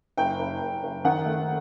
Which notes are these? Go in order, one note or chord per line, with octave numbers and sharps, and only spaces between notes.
F#1 G5
F#1
F#1
F#1
D#3 F#5
A3